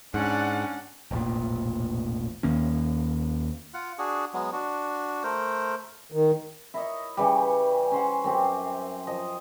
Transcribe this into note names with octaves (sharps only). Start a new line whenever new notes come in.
G#2 C#4 D4 D5 F#5
E1 A1 A#2
D#2 D#3 A#3 C#4
F4 F#5
D4 F#4 G#4
F#3 G#3 B3
D4 F#4
A3 A#4 C5
D#3
E4 A#4 C#5 D#5
C#3 E3 G3
C#4 C5 F#5
F#2 C4 G4
F3 D#5